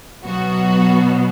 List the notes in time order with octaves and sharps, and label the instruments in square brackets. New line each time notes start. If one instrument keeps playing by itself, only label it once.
[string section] B2 F#3 B3 F#4